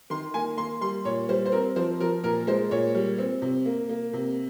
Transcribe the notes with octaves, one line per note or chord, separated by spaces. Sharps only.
D#3 C6
A#3 G#5
A#3 C6
G3 C6
A#2 C#5
G3 C5
C5
C4 A#4
F3 C5
F3 A#4
A#2 A#4
G#3 C5
A#2 C#5
G3
C4
C3
A#3
A#3
C3